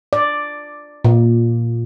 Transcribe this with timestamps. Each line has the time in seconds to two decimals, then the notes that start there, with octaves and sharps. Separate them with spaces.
0.13 D5
1.04 A#2